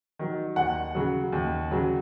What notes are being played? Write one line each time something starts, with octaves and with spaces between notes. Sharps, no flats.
D#3 F#3
D#2 F#5
C#3 F#3
D#2
C#3 F#3